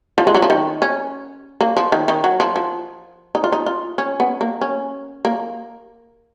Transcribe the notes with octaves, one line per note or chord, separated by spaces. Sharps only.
F3
G#3
F#3
F3
D#3
C#4
A#3
F3
D#3
D#3
F#3
F3
F3
D#4
F4
D#4
F4
C#4
B3
A#3
C#4
A#3